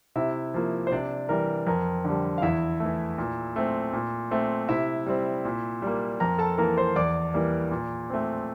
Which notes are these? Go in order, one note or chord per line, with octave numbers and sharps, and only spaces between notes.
C3 E4 E5
F3 A#3
C5
C3 D4 D5
E3 G3 A#4
F2 A#4
D3 G3
F5
E2 E4 E5
A3
E3
A#2
A3 C4
A#2
A3 C4
C3 E4 E5
G3 C4
A#2
G3 A#3
F2 A#4 A#5
A4 A5
E3 A#3 A#4 A#5
C5 C6
E2 D5 D6
E3 G3 A#3
A#2
A3 C4